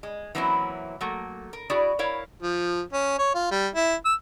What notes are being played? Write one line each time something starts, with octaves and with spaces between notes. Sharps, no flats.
G#3
E3 F#3 A#3 C4 C#4 E4
F#3 A3 A#3
A#4
E4 F#4 G#4 D5
E4 A#4 C#5 F5
F3
C#4
C#5
F4
G3
E4
E6